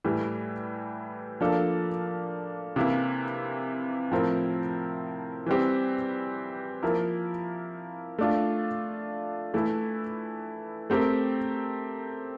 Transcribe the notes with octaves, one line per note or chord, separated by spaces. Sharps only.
A2 E3 G3
F3 A#3 D4 A4
C3 E3 A#3 E4
A2 F3 C4 E4 A#4
E3 G3 C4 G4
F3 A#3 E4 A#4
A3 D4 F4
E3 A3 E4
A3 C4 G4 A#4